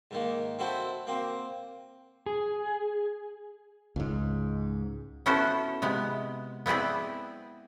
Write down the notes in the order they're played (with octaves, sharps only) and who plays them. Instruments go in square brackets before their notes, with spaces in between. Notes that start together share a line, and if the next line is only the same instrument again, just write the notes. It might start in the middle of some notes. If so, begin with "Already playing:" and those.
[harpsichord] G#2 D#3 A#3
C4 E4 F#4 A4 C5
A#3 C4
[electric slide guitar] G#4
[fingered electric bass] C#2 G#2
[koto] B3 C#4 E4 F#4 A4 C5
C3 G#3 B3
B3 C4 E4 G#4 D5